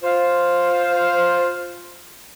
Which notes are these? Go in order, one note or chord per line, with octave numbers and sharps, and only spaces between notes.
F4 C5